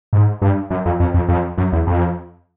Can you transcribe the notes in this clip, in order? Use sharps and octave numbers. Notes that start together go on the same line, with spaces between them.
G#2
G2
F#2
F2
F2
F2
F2
F#2
E2
F2